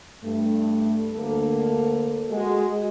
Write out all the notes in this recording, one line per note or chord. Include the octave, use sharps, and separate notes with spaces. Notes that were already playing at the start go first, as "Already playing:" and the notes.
G2 A3
D2 A#3 A4
G#3 F#4